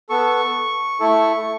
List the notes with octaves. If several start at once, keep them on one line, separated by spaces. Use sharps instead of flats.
B3 A4 C#6
A3 E4 A4